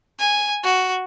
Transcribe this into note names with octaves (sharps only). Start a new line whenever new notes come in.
G#5
F#4